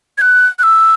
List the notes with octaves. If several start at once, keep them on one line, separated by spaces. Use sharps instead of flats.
G#6
F#6
F#6
E6